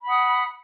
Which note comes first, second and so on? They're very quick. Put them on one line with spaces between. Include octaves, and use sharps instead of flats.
B5 F#5 D#6